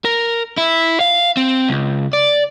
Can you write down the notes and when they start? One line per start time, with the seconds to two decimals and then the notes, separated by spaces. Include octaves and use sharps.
0.05 A#4
0.58 E4
1.00 F5
1.37 C4
1.69 C#2
2.13 D5